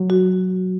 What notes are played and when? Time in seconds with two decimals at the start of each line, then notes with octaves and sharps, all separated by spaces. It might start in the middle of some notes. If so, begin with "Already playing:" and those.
Already playing: F#3
0.10 F#4